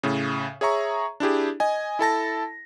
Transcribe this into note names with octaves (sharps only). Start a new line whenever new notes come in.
A2 C#3
G#4 C#5 E5 A#5 C#6
D4 E4 G4 G#4
D#5 G#5
E4 A4 A5 A#6